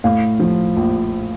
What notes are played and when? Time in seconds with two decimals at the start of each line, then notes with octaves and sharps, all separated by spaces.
0.04 A2 F5
0.40 F3
0.76 A#1